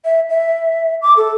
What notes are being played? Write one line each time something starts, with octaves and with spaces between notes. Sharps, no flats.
E5
E5
D6
A4